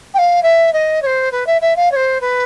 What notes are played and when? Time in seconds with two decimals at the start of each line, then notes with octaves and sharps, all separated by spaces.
0.14 G5
0.18 F5
0.43 E5
0.73 D#5
1.02 C#5
1.06 C5
1.32 B4
1.46 E5
1.61 E5
1.76 F5
1.91 C#5
1.96 C5
2.21 B4